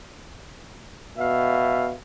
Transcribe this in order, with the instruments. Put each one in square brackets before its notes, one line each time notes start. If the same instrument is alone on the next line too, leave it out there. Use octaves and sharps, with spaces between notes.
[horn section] B2 E5 F5